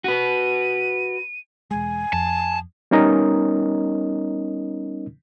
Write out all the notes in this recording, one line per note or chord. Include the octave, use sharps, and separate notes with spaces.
F#4 B4 D#7
E1 G#3 G#5
F2 A5
G3 B3 C#4 D#4 A#4 D#5